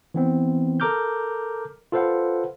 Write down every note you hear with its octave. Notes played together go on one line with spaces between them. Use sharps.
E3 B3 C4
A4 A#4 A#5 D6 F6 G6
F4 A4 B4 C5 F5 F#5